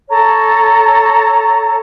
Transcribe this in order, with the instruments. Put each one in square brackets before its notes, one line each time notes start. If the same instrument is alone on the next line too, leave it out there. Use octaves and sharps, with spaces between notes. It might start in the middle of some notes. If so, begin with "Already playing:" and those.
[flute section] A4 C#5 A5 A#5